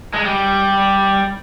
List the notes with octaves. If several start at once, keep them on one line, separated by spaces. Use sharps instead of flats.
G#3
G3